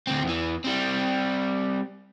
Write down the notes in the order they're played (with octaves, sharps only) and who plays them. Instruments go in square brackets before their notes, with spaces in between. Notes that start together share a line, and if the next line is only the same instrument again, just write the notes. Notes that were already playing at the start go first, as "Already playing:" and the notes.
[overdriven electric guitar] D2 C4
E2 E3
G3 C4